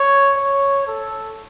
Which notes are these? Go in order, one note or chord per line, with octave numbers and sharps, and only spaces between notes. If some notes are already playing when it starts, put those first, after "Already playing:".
Already playing: C#5
C#5
A4